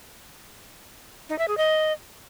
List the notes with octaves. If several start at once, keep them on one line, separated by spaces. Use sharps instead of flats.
D#4
E5
G#4
D#5